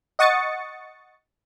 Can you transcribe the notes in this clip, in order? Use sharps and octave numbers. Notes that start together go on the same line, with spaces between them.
D#5 F#5 C#6 D#6 A6 C#7